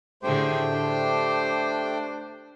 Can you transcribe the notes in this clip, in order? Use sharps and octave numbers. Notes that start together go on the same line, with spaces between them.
A2 D3 A3 G4 G#4 C5 G5
D4 C5